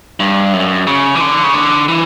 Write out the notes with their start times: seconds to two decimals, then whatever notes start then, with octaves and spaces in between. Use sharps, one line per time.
0.20 G2
0.53 F#2
0.87 C#3
1.15 E3
1.21 D3
1.44 C#3
1.54 D3
1.88 E3